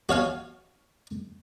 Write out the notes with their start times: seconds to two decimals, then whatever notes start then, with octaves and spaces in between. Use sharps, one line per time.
0.09 F#4 C#5 F5 G#5